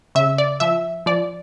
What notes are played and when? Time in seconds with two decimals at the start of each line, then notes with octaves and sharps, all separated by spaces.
0.15 C#3 E5
0.38 D5
0.60 F3 E5
1.06 F3 D5